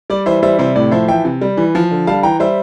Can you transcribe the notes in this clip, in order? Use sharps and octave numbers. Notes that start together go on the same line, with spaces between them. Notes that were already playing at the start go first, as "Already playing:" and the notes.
G3 D5
E3 C5 E5
G3 C5 E5
C3 C5 E5
A2 D5
F3 C5 E5
E3 E5 G5
C3
G3
E3
F3
D3
G3 F5 A5
E3 G5 A#5
G3 C5 E5